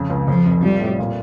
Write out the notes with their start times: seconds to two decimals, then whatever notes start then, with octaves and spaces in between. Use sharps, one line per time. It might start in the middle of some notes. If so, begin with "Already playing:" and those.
Already playing: F2 C#3
0.10 C#2
0.28 F2 F3
0.46 F1
0.63 F3 G3
0.80 A2
0.99 A#2